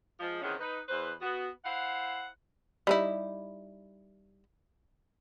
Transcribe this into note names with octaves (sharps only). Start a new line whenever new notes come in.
F3 G#3
C3 D#3 E3 B3 C#4 G#4
D#4 B4
E2 B4 C5
B3 F#4
E4 C5 F5 F#5
G3 D#4 E4